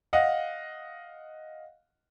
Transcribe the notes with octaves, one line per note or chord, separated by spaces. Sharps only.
D#5 F5 F#5